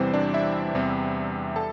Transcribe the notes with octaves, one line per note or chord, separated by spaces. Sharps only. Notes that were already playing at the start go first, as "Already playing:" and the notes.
Already playing: E2 C3 E3 G3 C4 C5
D4 D5
E4 E5
E2 C3 G3 C4
G3 A4 A5